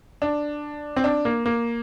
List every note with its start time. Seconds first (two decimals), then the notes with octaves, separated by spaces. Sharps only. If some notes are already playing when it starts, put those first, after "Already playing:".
0.22 D4
0.96 C4
1.04 D4
1.25 A#3
1.46 A#3